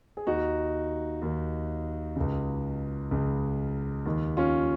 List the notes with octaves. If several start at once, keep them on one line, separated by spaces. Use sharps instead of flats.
G#4
D#2 D#3 D#4 F#4
D#2 D#3
C#2 C#3
C#2 C#3
D#2 D#3
C#4 F4